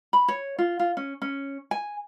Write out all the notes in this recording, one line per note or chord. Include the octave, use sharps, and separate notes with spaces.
B5
C#5
F4
F4
C#4
C#4
G#5